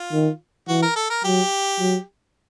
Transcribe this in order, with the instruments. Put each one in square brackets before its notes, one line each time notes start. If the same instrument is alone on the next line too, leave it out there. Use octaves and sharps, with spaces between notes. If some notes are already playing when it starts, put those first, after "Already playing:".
Already playing: [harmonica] F4
[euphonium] D#3
[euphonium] E3 [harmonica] F#4
[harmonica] A#4
A4
A#4
[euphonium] F#3 [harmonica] G4
[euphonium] F#3